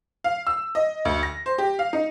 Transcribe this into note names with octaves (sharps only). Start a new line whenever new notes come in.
F5
E6
D#5
D2
A#6
C5
G4
F5
D#4